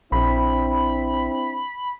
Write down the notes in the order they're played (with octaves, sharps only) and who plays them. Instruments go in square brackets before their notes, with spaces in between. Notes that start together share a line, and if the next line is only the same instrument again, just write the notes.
[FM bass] A#1 [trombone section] C4 D4 E4 [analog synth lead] B5